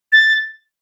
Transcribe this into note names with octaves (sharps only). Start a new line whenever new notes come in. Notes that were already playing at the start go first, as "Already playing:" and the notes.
A6